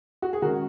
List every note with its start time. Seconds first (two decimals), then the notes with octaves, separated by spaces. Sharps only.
0.22 F#4
0.33 G#4
0.42 D#3 G#3 C#4 F#4 A#4